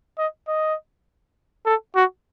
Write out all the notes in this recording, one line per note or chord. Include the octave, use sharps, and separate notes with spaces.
D#5
D#5
A4
F#4